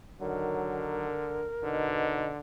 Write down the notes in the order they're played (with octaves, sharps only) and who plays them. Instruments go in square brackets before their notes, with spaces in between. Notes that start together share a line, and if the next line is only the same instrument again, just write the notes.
[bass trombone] D3 [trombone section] D#3 F#3 [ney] A#4
[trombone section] B2 D#4 [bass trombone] D3